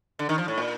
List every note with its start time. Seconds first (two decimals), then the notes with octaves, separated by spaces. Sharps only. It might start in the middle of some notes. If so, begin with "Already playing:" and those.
0.19 D3
0.29 D#3
0.38 F3
0.48 A2
0.58 A#2